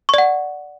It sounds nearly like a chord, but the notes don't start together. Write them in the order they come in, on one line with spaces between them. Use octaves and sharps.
C#6 D5 F#5